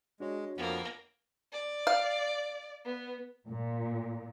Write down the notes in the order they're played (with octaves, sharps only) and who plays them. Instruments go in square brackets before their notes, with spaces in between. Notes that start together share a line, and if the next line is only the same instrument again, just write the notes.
[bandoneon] G#3 [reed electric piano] D4 F#4 C#5
[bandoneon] F2 F3 B3 [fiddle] A#3
[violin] D5
[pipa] F5
[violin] B3
[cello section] A#2